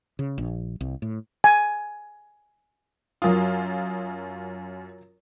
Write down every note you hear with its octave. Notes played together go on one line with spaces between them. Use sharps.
C#3
A#1
C2
A2
G#5
F#2 F#3 F4 A#4 D#6